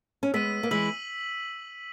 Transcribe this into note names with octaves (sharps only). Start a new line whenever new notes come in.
C#4
G#3 B3 E6 B6 D#7
A#3
E3 G#3 E6 B6 F#7